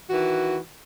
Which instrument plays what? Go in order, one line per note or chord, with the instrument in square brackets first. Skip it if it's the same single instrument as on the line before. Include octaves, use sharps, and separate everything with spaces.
[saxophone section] D#3 E3 F#4